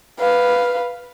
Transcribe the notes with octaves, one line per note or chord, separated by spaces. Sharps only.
B4 F5